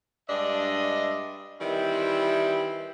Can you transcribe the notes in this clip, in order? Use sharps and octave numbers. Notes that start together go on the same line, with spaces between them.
G2 G#3 D4 D#5 E5
D#3 E3 G3 C4 E4